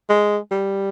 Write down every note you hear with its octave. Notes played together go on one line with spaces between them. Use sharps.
G#3
G3